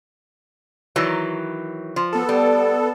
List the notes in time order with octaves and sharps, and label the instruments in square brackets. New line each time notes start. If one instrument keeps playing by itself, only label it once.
[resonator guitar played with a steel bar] D#3 E3 F#3
F3
[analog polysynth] B3 A4
[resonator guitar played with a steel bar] G3